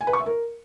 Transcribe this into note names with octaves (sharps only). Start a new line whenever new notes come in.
G#5
B4
C#6
E5
A#4